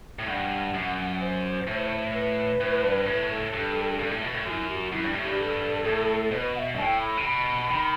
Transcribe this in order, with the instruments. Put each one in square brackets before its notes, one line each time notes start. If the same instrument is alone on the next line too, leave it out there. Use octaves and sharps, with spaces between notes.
[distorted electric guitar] A2
[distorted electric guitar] G2 [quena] F#5 G5
[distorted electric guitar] F#2
[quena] C5
[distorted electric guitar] A2
[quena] B4
[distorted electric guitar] A2
G2
[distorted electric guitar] A2 [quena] B4
[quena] A4
[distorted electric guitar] G2
G2
A2
B2
A2
[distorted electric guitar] F#2 [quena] F#4
[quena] E4
G4
F#4
[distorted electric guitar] F#2 [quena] E4
[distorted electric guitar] G2
A2
[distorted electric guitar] G2 [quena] G4
[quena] A4
[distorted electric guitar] A2
[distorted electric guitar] B2 [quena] C5
[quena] B4
F#5
E5
[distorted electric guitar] G2
[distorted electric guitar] A2 [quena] G5 A5
[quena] B5
[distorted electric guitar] C3
[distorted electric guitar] B2 [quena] B5
[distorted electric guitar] D#3